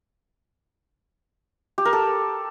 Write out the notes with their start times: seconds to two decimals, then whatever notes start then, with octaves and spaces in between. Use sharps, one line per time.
1.78 G4
1.85 A#4
1.93 A4